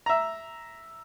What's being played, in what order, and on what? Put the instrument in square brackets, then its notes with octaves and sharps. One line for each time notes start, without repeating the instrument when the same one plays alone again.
[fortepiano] E5 A#5